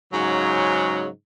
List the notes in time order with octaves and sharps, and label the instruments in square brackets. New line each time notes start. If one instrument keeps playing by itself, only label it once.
[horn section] G#2 C#3 F#3